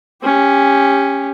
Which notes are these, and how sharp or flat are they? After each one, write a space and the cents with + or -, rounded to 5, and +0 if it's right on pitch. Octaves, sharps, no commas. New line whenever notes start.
C#4 +0 G4 +20